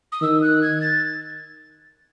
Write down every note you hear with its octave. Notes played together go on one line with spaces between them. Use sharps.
D#6
D#3 E6
F#6
G#6
A6